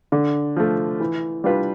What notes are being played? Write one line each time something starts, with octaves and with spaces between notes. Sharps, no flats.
D3
F3 A3
E3
G3 D4 F4 B4